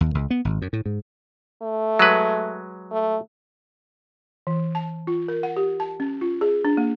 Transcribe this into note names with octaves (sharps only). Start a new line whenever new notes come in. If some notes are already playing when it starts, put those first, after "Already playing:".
D#2
C#2
B3
G#1
F#2
A2
G#2
A3
F#3 G#3 B4
A3
E3
A5
F4
A#4
F#5
G4
A5
C#4
F4
G#4
D4
A#3